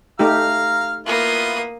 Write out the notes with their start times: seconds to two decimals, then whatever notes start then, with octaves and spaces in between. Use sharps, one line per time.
0.19 A3 D#4 G4 F5 A#5 F6
1.06 A#3 B3 E4 F4 D#6